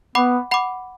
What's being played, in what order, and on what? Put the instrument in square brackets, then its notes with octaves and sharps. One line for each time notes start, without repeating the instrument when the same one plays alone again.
[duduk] B3 [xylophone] F#5 B5 D6
[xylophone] F#5 B5 D6